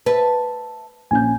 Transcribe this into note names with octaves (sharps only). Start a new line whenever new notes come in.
B4 E5 A5
A#1 C#4 G#5 G6